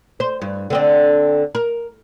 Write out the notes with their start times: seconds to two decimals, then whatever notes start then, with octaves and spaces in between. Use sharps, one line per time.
0.20 C5
0.42 G2
0.70 D3 C4 D4
1.55 A#4